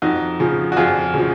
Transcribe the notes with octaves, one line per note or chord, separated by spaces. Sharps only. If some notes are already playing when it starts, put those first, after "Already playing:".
F2 D#4 F#4
C#3 F3
F#4
F2 F4 G#4
C#3 F3